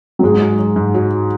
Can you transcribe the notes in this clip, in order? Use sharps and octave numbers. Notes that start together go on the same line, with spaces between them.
F#3
G#2 G#3
F#3
F#3
G#2
F#3